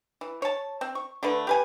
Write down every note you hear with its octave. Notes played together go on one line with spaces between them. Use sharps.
E3
C#5 A5
C4
C#6
D3 A3 B4
G4 B4 G#5